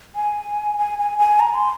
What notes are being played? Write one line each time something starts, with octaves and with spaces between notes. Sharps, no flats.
G#5
G#5
G#5
G#5
A#5
C6